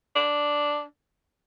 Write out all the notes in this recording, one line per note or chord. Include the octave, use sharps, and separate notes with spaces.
D4